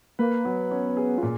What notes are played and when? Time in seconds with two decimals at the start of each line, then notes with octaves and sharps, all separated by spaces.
0.19 A#3 B4
0.45 F#3 B3
0.71 C#4
0.97 G#4
1.18 F4
1.23 A#2